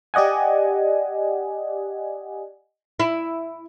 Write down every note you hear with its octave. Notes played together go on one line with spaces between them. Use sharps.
G4 D5 D#5 F#5 G#5
E4